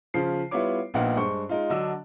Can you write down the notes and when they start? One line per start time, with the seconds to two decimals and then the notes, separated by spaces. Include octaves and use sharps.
0.14 C#3 F3 F4 C7
0.51 G3 B3 E4 F4 C#5 D6
0.94 A#1 A#2 B3 D#4 F5 F#5
1.16 G2 G#3 C5 C#6
1.49 G#3 D#4 F4
1.70 D3 F#3 D4 D#5 E6